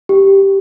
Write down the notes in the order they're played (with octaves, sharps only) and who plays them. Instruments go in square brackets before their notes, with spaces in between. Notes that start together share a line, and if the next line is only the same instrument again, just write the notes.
[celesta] G4